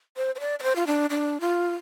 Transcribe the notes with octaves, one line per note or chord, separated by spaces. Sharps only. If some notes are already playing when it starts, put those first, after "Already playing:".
C5
C5
D5
D5
C5
F4
D4
D4
F4